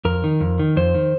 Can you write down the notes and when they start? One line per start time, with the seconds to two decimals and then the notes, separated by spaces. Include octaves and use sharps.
0.05 F2 A#4
0.24 D#3
0.40 F2
0.59 D#3
0.76 F2 C5
0.94 D#3